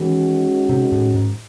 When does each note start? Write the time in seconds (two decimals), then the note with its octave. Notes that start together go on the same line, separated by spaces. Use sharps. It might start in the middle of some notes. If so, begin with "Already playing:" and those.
Already playing: D#3 E3 G#3 C#4 F#4
0.69 C3
0.92 A2
1.14 G#2